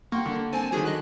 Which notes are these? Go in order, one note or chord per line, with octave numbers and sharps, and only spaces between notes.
A#3 F#5 G5 C6 C#6
D3
C4 G#5 A5
D3 D#3 F#3 G#4 G#5
D#5 F#6